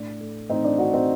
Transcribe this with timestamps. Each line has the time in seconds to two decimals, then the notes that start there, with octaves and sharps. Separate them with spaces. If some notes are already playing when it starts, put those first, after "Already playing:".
Already playing: A2 D4
0.20 A3
0.50 A2 C4 D#4
0.64 D4
0.78 A3 D4 F#4
0.93 C4 D#4